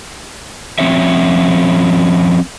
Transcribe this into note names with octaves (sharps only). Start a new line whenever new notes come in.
F3 C4 C#4 C#5 E5